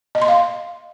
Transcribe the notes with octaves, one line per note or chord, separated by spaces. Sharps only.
D#5
C6
F5